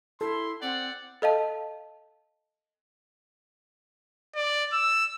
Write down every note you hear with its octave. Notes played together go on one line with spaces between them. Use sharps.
E4 A4 C6
C4 D5 F#5
A4 D#5 F5 A5
D5
E6